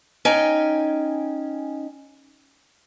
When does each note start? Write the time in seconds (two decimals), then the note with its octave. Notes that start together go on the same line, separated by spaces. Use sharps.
0.25 C#4 D#4 G5 G#5